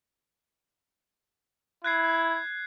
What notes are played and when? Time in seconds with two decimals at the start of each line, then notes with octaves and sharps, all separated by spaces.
1.84 E4 F#6 G#6 C7